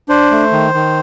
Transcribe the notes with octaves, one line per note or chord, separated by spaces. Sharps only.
D4 C5
A3
D#3
D#3